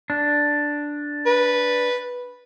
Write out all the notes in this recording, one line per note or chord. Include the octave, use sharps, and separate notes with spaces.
D4
B4